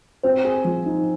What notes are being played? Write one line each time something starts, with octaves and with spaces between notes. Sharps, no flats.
C4 C5
G#4
F3
D#4